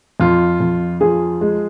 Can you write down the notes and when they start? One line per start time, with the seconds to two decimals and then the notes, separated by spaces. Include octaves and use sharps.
0.20 F2 F4
0.60 F2
1.01 F3 G#4
1.41 G#3